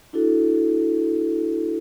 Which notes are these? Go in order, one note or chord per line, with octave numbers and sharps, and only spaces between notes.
D4 E4 F#4 A4